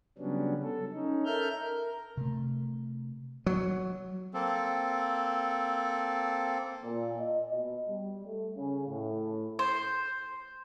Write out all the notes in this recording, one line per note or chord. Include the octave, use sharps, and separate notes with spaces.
C#3 F#3 G3 B3 C#4 D4
A4
C#4 D#4
A4 A#4 E5 F6 G6
A#4
C3 A3
F#3
A#3 C4 A4
A#2
D#5
B2
G3
A3
C#3
A2
C5